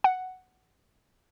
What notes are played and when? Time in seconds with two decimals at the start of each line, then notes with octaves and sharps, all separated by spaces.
0.04 F#5